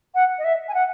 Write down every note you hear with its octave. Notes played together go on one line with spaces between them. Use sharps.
F#5
D#5
E5
G#5
F#5